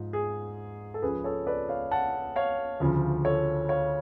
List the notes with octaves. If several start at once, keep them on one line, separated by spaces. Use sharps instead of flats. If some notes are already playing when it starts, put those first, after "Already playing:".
Already playing: G#2 F3
G#4
A4
C#2 C#3 F3 G#4 B4
A4 C#5
B4 D5
C#5 F5
F#5 A5
C#5 F5
D2 C#3 F3
A4 C#5
C#5 F5